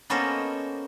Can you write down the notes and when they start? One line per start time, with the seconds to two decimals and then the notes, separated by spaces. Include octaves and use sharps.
0.10 A#3 B3 C#4 A4 C5 D#5